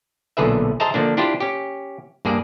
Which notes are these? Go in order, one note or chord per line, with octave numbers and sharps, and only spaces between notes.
B1 A#2 D3 G#4 B4 E5
G#4 C5 D#5 E5 A5 A#5
D3 F3 A#3 D4
D4 E4 F4 G4 C5
C#4 G4
G2 A#3 G#4 D5